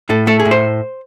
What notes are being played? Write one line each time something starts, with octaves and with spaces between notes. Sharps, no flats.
A2 A4
A3 A4
G#4
A2
C5